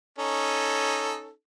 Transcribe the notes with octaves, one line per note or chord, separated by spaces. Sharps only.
C#4 D#4 A4